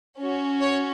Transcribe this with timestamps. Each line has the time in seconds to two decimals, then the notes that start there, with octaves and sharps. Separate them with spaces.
0.21 C#4 F#4
0.61 C#5